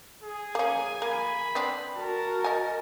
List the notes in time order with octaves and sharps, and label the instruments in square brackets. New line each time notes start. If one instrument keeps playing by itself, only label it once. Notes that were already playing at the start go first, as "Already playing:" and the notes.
[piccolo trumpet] G#4
[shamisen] A#3 C#4 [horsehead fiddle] G#5
[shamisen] A#3 [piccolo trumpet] B5
[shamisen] B3 C4 D4
[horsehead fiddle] F#4 A#4 [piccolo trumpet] A5
[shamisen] D#5 G#5